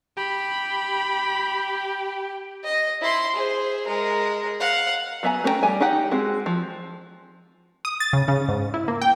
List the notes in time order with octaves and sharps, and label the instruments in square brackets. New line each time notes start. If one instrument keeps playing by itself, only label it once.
[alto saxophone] G4 [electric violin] B5
[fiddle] D#5
E4 C6
G#4 C5
G#3 A#4
F5 F#5
[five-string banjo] F#3 B3 E5 G#5 A#5
A3 C#4 B4 G5 A#5
G3 G#5
D#4 G4 F#5 G5
G#3 C4 F#4
F3
[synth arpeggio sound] D#6
A6
C#3
C#3
G#2
E4
A#3
G5